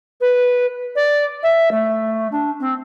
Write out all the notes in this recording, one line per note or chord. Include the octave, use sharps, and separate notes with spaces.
B4
D5
E5
A3
D4
C4